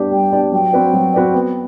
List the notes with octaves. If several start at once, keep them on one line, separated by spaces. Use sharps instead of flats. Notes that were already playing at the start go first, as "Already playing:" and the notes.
Already playing: G3 B3 D4 G4 D5
G3 G5
B3 D4 G4 D5
F#3 G5
C4 F#4 B4 D5
F#3
C4 F#4 B4 D5
B3